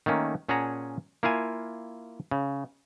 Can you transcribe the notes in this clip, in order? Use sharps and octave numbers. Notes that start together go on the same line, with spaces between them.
D#3 A3 A#3 C#4
A#2 C#4 G#4 F#5 A5 A#5
A#3 E4 F4 F5 G#5
C#3